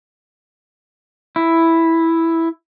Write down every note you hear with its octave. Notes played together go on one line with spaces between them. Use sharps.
E4